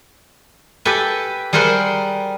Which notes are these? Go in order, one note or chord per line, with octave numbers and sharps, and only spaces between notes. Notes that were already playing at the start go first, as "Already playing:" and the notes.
G4 A4 B4 G#5
G3 G#4 A#4 C5 F#5 C6